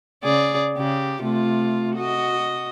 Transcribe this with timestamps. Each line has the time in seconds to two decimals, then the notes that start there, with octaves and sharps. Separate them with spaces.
0.24 C#3 G#4 D5
0.78 C#3 G4
1.22 C3 A3 F4
1.96 F#4 D#5